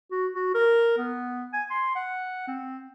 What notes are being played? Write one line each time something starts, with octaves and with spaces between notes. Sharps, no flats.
F#4
F#4
A#4
B3
G#5
C6
F#5
C4